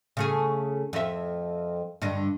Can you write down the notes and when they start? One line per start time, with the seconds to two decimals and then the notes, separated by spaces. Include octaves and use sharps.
0.17 C#3 A3 G#4
0.93 F2 E5
2.02 G2 D3 D#5